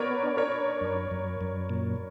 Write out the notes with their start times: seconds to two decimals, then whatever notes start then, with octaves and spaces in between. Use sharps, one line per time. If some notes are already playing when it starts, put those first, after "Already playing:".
Already playing: B3 A#4 B4 C#5 D5
0.23 D4
0.37 A#4 C#5
0.52 D4
0.81 F#2
1.11 F#2
1.41 F#2
1.70 A#2